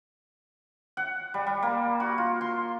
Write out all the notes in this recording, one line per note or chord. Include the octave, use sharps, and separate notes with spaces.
F#5
G3
G3
A#3
F#4
F4
C6